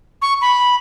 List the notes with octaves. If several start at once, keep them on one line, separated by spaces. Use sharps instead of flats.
C#6
B5